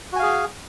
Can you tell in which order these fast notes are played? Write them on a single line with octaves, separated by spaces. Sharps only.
F#4 G#5 F5 G#4